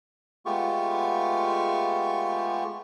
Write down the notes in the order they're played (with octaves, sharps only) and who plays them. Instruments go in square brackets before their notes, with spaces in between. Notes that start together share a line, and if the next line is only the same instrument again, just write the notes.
[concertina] G#3 A3 B3 F4 G4 C#6